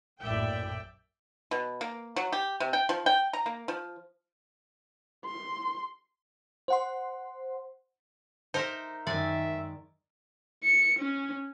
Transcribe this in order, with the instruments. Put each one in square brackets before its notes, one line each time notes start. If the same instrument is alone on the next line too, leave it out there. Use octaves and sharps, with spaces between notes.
[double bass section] A#1 F#2 A2 [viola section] D5 E5 G5
[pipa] B2
A#3
F#3
G4
C3
G5
F3
G5
A#5
A#3
F3
[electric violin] C6
[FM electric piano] C5 F#5 C6
[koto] D#4 A#4 E5 [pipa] C5
[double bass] F#2 D#3 [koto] G#3 D5 G#5 [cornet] E5
[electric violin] C#7
C#4